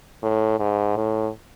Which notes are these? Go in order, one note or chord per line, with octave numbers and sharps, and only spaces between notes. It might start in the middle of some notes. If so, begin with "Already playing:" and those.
A2
G#2
A2